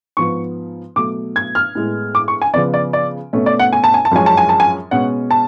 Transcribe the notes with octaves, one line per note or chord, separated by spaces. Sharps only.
G#2 F3 B3 C#6
B2 F#3 A3 D6
G#6
F6
A2 G#3 B3
D6
C#6
G#5
C#3 F3 B3 D5
D5
D5
B2 A3 C#4
D5
F#5
G#5
A5
G#5
A5
F#2 F3 G#3 C#4 G#5
A5
G#5
A5
G#5
B2 G#3 C#4 F#5
A5